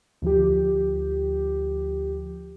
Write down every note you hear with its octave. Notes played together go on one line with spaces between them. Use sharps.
D2 F3 G4